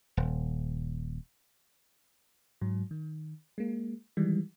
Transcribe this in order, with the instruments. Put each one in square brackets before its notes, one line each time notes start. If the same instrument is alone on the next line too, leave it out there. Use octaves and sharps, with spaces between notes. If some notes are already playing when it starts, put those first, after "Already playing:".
[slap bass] D#1
[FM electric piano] G#2 F#3
D#3
G#3 A#3
D#3 E3 G3 G#3